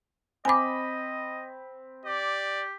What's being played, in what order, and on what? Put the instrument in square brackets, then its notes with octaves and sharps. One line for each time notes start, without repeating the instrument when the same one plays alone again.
[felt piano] C4 B5 [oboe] D#5 [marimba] G#5 D6
[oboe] G4 [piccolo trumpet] D5